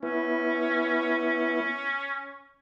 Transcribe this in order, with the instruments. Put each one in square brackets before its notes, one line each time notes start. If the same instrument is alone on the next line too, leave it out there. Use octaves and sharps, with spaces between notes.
[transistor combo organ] B3 E4 [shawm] C#4